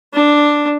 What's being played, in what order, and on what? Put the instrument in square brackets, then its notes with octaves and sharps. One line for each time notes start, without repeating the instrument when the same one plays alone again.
[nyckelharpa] D4